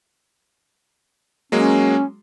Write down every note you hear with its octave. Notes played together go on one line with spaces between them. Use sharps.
F#3 G#3 A#3 C#4